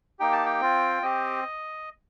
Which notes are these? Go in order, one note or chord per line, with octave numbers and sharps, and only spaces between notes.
A#3 D#4 G4 G5
A5
G5
C4 F4
C4 G4 D#5